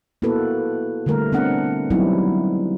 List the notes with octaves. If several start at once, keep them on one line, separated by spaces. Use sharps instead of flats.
A#3 B3 E4 F#4 A4 B4
D3 G3 A3 A#4
B3 C4 D4 F#5
F#3 G3 B3 C4 D#4 E4